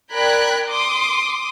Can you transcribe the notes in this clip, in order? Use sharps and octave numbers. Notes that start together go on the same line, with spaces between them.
A#4 D5 G5 B5 F#6 G#6
C6 D6 D#6